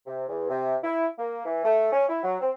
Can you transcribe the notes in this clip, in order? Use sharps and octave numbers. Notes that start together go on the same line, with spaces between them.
C3
E2
C3
E4
A#3
E3
A3
C#4
E4
F#3
C4